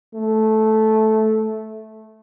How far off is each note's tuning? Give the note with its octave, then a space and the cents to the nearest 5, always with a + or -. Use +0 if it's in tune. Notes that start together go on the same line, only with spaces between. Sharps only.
A3 -10